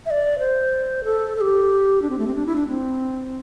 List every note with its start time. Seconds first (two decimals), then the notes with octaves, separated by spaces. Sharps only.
0.06 E5
0.11 D5
0.39 C5
1.04 A4
1.36 A4
1.41 G4
2.02 D4
2.10 C4
2.19 A3
2.27 C4
2.35 D4
2.46 E4
2.56 D4
2.68 C4